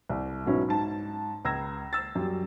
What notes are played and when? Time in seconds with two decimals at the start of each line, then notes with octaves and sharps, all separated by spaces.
0.10 C2
0.46 G#2 B2 F#3 C#4 E4
0.68 G#2 A5
1.45 C#2 A#5 E6 G#6 A#6
1.93 E6 A6
2.15 F#2 G3